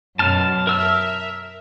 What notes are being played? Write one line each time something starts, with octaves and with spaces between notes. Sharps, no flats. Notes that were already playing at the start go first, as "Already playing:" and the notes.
F#2 B2 A5 F6
A#4 E5 E6 F6